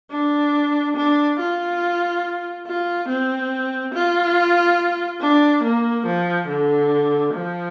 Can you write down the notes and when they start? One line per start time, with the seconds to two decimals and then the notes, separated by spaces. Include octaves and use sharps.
0.11 D4
0.96 D4
1.39 F4
2.67 F4
3.08 C4
3.94 F4
5.21 D4
5.64 A#3
6.06 F3
6.48 D3
7.34 F3